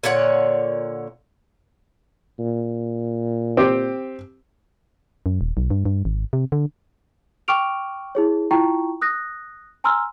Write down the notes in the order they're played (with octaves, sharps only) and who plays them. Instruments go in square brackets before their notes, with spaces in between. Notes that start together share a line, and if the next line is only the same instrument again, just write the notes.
[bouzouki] A#2 D3 C#5 F#5
[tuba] A#2
[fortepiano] C4 G4
[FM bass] F#2
D#1
B1
G2
G2
G#1
C3
D3
[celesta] G5 C#6 D6 F6 D7 F7
E4 G#4 C#5
E4 F4 G5 A#5 C#6
D#6 F#6 A#6
G#5 A#5 C6 E6 F6